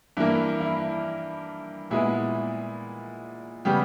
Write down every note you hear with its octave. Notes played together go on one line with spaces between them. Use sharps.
G2 E3 A#3 E4
E4
A#2 G#3 B3 E4
C#3 G3 B3 G4